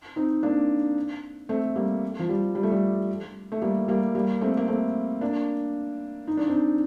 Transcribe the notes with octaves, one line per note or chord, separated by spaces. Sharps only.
C4 D#4
A#3 D4
A3 C4
G3 A#3
F3
G3
G3
A3
G3
A3
G3 A#3
G3 A#3
G3 A#3
A3 C4
A#3
A3 C4
A#3 D4
D#4
D4
C4 D#4